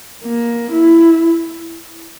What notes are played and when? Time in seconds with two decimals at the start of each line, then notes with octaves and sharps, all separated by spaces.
0.25 A#3
0.72 E4